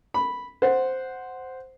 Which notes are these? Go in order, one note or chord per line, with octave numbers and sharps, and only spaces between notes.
B5
C5 F#5